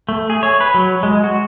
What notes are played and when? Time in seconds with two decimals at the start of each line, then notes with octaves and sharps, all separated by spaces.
0.09 A3
0.30 G#4
0.43 C#5
0.61 B4
0.74 F#3
1.03 G#3
1.24 F#4